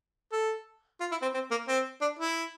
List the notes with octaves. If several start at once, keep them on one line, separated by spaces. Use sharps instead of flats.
A4
F4
E4
C4
C4
A#3
C4
D4
E4